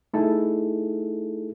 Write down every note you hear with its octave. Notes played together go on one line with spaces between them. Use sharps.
A3 D#4 E4 G#4 A4